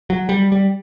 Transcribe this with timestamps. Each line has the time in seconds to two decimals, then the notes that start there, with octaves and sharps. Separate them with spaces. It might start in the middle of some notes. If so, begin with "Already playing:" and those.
0.10 F#3
0.29 G3
0.52 G3